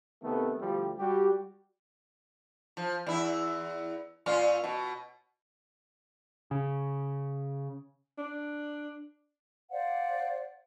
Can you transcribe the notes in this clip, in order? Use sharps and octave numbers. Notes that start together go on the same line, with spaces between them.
C3 D#3 A3 B3 A4
D2 F3 G3 G4
G3 F#4 G4
F3
E2 E4
A#2 C#4 F4
B2
C#3
D4
C5 D5 F5 F#5